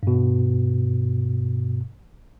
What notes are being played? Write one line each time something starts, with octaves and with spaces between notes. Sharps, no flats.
G2 B2